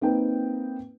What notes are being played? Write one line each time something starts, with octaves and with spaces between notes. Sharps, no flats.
A#3 C4 D#4 B4 G5